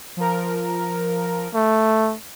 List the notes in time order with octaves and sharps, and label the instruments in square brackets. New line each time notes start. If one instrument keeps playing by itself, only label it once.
[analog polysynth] F3 A#4
[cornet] A3